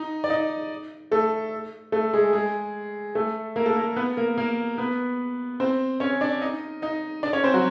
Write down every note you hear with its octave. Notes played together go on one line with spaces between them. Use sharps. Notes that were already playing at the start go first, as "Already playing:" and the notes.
Already playing: D#4 D#5
D5
D#4 D#5
A3 A4
A3 A4
G#3 G#4
G#3 G#4
A3 A4
A#3 A#4
A3 A4
A#3 A#4
B3 B4
A#3 A#4
A#3 A#4
B3 B4
C4 C5
C#4 C#5
D4 D5
D#4 D#5
D#4 D#5
D4 D5
C#4 C#5
C4 C5
F#3 F#4